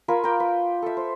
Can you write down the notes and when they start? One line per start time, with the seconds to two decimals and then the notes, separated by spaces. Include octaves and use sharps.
0.08 F4 A#4 G#5 B5
0.24 A#4 G5 D6
0.40 B4
0.82 A4 E5
0.97 C5